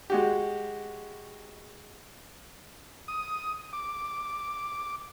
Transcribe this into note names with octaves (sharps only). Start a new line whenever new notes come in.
G#3 F#4 G4
D#6
D6